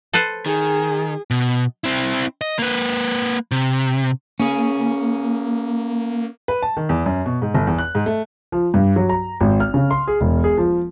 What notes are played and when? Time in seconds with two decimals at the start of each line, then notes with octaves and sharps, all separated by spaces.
0.13 A4 B4 C5
0.46 D#3 G#4
1.31 B2
1.84 C4 E4
2.41 D#5
2.59 A#3 B4
3.52 C3
4.40 A#3 C#4 G#4
6.48 B4
6.62 A5
6.77 D#3
6.89 E2
7.06 F#2
7.26 B2
7.42 G#2
7.54 G1
7.67 E2
7.78 F#6
7.95 G#2
8.06 A3
8.52 F3
8.74 G2
8.96 F#3
9.09 A#5
9.40 G#1
9.60 F6
9.74 C#3
9.91 C6
10.08 G#4
10.21 E1
10.44 G#4
10.57 F3